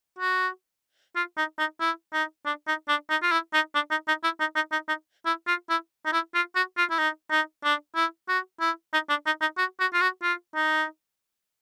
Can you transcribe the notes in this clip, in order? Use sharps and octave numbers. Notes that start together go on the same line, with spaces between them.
F#4
F4
D#4
D#4
E4
D#4
D4
D#4
D4
D#4
F4
E4
D#4
D4
D#4
D#4
E4
D#4
D#4
D#4
D#4
E4
F4
E4
D#4
E4
F4
F#4
F4
E4
D#4
D#4
D4
E4
F#4
E4
D#4
D4
D#4
D#4
F#4
F#4
F4
F#4
F4
D#4